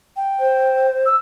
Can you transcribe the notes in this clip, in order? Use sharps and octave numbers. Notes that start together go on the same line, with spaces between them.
G5
C5
E6